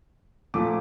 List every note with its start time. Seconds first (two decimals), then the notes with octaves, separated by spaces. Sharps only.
0.54 A#2 F3 A3 D6